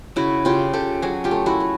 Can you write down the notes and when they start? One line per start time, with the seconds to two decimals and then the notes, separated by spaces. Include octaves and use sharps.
0.16 C#3 E4 F#4
0.45 C#3 F4 G4
0.73 C#3 G4 A4
1.02 F#3 F#4 G#4
1.24 F4 G4
1.31 A3
1.46 E4 F#4
1.60 A3